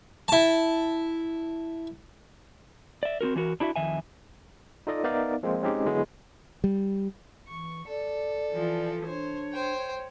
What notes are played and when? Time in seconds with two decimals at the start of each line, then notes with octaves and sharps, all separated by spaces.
0.28 E4 A5
3.03 D5 E5
3.21 C4 C#4 F#4 A#4
3.36 E3 F#3 F#4 A#4
3.60 D4 E4 F#4 D5 E5
3.76 F2 D#3 E5 G#5
4.87 D#4 F4 A4 D5 D#5
5.04 B3 D#4 A#4 D5 E5 F5
5.43 F3 G#3 A#3 C4 F4
5.63 G#3 C4 C#4 D#4 G4
5.85 D3 F#3 G#3 B3 E4 G#4
6.64 G3
7.48 E3 C#6
7.88 A4 D5
8.51 E3 F3
9.06 D4 C5 C#5
9.53 C5 G5